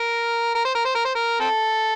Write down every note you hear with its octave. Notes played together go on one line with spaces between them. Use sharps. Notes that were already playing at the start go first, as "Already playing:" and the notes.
Already playing: A#4
A#4
C5
A#4
C5
A#4
C5
A#4
C4 A4